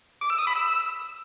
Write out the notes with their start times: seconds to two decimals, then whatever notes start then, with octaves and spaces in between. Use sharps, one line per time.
0.21 D6
0.30 E6
0.39 D#6
0.47 B5
0.56 E6